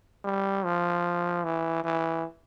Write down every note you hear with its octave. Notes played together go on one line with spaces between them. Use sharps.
G3
F3
E3
E3